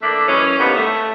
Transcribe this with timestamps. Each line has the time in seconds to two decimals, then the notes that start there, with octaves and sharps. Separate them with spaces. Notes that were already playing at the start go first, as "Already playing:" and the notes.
0.02 E3 A3 A#3 D4 D5 E5
0.28 F#2 E3 G#3 C#4
0.59 A2 C3 D#3 G3 A#3 B3
0.76 A3